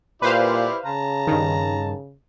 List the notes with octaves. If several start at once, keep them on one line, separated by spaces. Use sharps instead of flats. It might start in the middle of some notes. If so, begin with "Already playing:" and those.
A#2 E4 G4 B4 C5 D5 F5
C#3 A5 A#5
G2 D#3